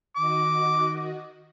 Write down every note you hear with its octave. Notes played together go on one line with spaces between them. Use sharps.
D#3 F#4 D#5 D6